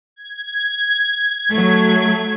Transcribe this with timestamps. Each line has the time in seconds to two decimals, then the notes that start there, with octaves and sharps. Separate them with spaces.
0.16 G#6
1.51 F#3 A3